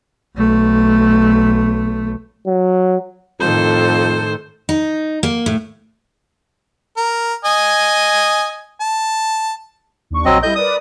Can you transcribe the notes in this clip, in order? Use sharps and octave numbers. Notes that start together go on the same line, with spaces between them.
B1 A3
F#3
F2 A2 D#3 A4 C5
D#4
A#3
A2
A#4
D#5 G#5
A5
D#2 D4 C#6
A#1 F#3 C4 D#5
G3 E4 A4 D#5 G6
A#4 B4 D5 D#6